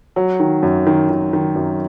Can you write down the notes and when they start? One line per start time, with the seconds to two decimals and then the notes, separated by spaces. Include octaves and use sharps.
0.16 F#3
0.40 D#3
0.63 F#2
0.87 D#3
1.09 D#3
1.33 D#3
1.56 F#2